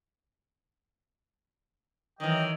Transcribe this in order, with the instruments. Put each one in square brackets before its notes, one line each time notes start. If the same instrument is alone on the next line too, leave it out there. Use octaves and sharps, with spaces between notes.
[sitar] D#3 E3 [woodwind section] F#3 D#5 G5